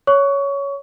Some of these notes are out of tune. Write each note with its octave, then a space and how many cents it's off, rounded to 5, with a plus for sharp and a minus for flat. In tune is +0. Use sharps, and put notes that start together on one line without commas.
C#5 +10 C#6 +25